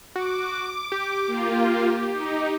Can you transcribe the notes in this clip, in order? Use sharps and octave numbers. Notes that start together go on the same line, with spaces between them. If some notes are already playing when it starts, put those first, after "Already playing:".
F#4 D6
G4
A#3 F4
D#4